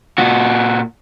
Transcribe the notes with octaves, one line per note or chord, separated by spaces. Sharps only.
A#2 F#4